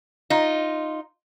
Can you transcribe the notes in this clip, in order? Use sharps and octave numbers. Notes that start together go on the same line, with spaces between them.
D#4 F4